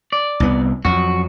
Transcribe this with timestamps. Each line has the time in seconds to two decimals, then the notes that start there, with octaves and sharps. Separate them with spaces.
0.12 D5
0.40 C2 B3
0.85 F2 F#3 F#4